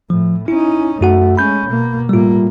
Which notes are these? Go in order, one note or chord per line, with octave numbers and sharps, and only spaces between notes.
A2 F3
C#4 D#4 E4
F#2 A3 F#4 F#5
G#3 C#4 B5 G6
B2 A#3
A2 G3 A#3 F4